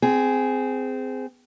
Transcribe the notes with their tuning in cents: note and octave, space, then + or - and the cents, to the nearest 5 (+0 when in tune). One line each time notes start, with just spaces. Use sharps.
C4 -20 G#4 +5